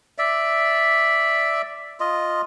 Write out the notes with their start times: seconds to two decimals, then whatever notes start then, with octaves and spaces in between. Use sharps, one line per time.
0.18 D5 E5
2.00 F4 D#5